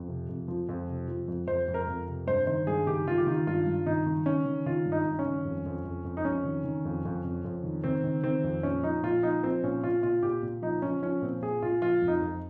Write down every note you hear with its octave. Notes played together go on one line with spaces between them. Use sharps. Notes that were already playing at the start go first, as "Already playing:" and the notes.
Already playing: F2
C3
F2
F3
F2
C3
F3
F2
F2 C5
F2
A#4
F2
C3
G2 C5
D#3 C5
G2 G#4
D#3 G4
D#3 F4
G4
D#3 F4
G2 F4
G2
D#3 D#4
D#3
D#3 C#4
D#3
D#3 F4
G2
D#4
G2
C#4
D#3
F2
F2
F2
F2
D#4
F2 C#4
D#3
D#3
F2
F2
F2
F2
D#3
D#3 C4
D#3
D#3 C4
F2
A#2 C#4
F3 D#4
A#2 F4
F3 D#4
F3 C4
A#2 C#4
A#2 F4
A#2 F4
A#2 G4
A#2
F3 D#4
F3 C#4
F3 C#4
A#2 C4
A#2 G#4
A#2 F4
F3 F4
F2
D#4
F2